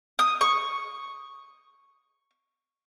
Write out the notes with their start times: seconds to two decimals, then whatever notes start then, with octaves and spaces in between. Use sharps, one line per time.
0.19 D#6
0.41 C#6